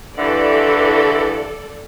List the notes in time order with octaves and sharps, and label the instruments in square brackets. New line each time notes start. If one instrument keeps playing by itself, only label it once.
[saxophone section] G2 D3 E3 [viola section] A4 D5